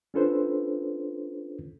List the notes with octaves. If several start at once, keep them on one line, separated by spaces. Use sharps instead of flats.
C#4 D4 F4 A4 B4 C5